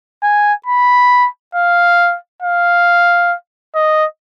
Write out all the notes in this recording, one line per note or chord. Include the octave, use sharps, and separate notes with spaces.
G#5
B5
F5
F5
D#5